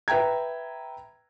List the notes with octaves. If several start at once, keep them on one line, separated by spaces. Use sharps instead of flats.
B4 E5 G5 A#5 G#6